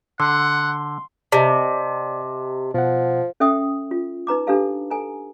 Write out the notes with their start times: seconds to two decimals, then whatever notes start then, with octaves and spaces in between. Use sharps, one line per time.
0.20 D3 F#5 C6
1.32 C3 D5 D#5 A5
2.74 B2 F3 F#5
3.40 C#4 A4 E5 G5 D#6
3.91 F4
4.27 D#4 B4 A#5 D6
4.47 D4 G4 A4 B4 F5 A5
4.91 A4 G#5 A#5